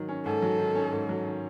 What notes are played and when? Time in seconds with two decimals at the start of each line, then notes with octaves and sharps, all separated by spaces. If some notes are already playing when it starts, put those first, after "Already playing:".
Already playing: G#2 D#3 F#3
0.09 C#4
0.26 G#2 A4
0.42 F#3
0.58 D#3
0.75 C#4
0.92 G#2
1.09 F#3
1.26 D#3